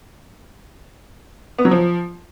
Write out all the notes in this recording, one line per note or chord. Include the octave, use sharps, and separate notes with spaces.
B3
F#3
F3